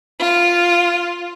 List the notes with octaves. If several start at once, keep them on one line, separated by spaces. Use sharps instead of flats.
F4